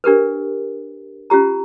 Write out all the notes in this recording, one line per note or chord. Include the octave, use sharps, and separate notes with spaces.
D4 G4 A#4 B4
C#4 F4 G4 A#5